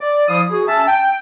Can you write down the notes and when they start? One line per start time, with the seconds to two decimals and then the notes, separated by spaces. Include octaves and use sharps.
0.01 D5
0.29 F3 E4 F5 D#6
0.50 F#4 G#4
0.67 C#4 E5 A5
0.87 G5